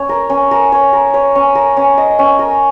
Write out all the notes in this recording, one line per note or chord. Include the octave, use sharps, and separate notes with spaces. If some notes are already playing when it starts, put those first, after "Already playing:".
Already playing: C#4 C#5
A#4
C#4
A#4
C#5
A#4
C#5
C#4
A#4
C#4
D#5
C#4
A#4